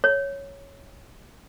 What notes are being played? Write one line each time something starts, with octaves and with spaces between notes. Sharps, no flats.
C#5